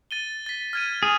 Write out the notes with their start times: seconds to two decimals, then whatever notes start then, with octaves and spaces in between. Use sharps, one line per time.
0.11 A6 D#7 G7
0.46 A6 B6
0.73 F6 G#6 D#7
1.03 G#4 F7